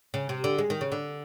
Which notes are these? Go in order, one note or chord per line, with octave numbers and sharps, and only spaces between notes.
C#3
C3
D3
G#3
D#3
C#3
D3